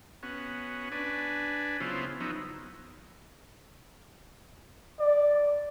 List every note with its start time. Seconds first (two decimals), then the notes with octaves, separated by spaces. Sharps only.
0.23 B3 C#4 F#4
0.92 D4 B4 G#5
1.80 C#3 F#3 B3 E4 F4 C5
2.20 F3 F#3 B3 D#4 E4
4.99 D5